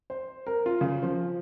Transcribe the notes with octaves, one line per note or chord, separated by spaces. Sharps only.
C5
A#4
F4
C#3
F3